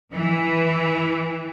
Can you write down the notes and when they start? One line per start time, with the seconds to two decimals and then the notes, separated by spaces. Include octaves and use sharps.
0.13 E3